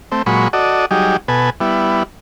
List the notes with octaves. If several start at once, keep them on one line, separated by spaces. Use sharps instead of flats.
A3 C4
A#2 F#3 G#3 B5 C#6
F#4 A4 D5 D#5
F#3 G3 D#4 G4 G#4
B2 A4 B4 G#5
G3 B3 E4